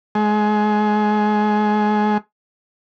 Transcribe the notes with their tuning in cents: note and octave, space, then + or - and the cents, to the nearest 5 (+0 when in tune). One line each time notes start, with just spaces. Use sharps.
G#3 +25